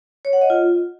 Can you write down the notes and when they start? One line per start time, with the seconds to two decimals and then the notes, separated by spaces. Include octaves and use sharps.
0.25 C#5
0.33 F#5
0.41 D#5
0.50 F4